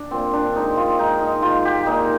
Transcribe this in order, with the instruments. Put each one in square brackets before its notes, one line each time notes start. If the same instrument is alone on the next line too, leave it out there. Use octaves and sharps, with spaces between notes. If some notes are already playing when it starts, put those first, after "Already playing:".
Already playing: [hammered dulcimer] D4
A#2 C4
D4
G#3 D#4
F4
G#3 D#4
D#4
G#3 F4
G4
A#2 D#4